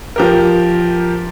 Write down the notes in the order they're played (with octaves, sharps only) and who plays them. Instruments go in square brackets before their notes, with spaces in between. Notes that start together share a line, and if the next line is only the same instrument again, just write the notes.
[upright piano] F3 G4 A#4